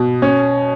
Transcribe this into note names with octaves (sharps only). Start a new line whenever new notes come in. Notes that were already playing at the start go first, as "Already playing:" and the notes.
Already playing: B2
C#4